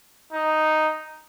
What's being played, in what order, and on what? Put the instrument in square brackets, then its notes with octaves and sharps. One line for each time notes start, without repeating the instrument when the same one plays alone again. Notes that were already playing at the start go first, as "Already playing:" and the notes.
[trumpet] D#4